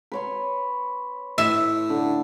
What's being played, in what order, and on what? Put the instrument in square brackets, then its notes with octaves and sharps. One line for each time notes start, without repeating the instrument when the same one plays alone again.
[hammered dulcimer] B4 C#5 C6
[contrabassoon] A2 [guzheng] E5
[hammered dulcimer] D3